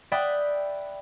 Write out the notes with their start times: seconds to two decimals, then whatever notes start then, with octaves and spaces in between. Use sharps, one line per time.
0.12 D5 E5 G5 B5 D#6 F#6